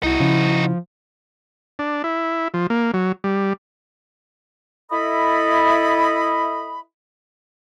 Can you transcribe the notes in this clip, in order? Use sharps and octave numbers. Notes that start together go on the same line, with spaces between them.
C2 D#4 E4 F#4
C#3 F3
D4
E4
F3
A#3
F#3
G3
E4 A4 D#5 B5